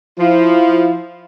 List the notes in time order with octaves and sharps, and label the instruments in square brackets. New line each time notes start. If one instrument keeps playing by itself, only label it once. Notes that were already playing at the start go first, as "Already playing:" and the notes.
[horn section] F3 [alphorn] E4